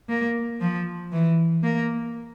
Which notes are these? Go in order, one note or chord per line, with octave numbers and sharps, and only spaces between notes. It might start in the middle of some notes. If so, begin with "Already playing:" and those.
A#3
F3
E3
A#3